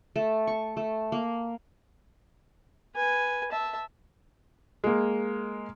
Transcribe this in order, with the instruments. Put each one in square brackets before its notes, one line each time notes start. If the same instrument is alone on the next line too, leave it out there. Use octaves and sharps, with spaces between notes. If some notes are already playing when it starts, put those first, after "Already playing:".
[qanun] A3
C#6
A3
A#3
[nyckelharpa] B4 G#5
E5 A5
[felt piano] G#3 A#3